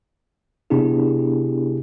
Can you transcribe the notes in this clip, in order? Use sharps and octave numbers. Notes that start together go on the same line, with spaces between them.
C3 B3 D4 E4 G4 G#4